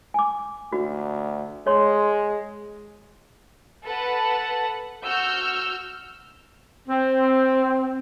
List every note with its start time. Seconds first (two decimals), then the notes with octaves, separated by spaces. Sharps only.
0.14 G#5 D6
0.72 D2 F#4
1.67 G#3 C#5 C6
3.84 A4 B4 F#5 A5
5.05 F#4 E6 F6 G6
6.88 C4